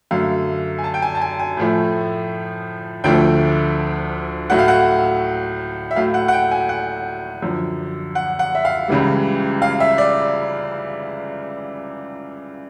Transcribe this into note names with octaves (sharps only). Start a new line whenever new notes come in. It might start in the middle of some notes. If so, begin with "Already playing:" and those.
F#2 D3 F#3 A3 F5
G#5
A5
G5
G#5
A5
G#5
G#5
A2 F3 A3
D2 D3 F3 A3 G5
A2 F#3 A3 F#5
F5
F#5
E5
A2 F#3 A3 F5
F#5
F#5
G5
G#5
F#5
F#2 D3 F3
F#5
F#5
E5
F5
C#2 C#3 E3 G3
F5
E5
D5